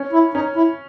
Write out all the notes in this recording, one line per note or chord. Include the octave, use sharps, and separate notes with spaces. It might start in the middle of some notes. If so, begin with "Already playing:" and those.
Already playing: C#4
E4
C#4 D#4
E4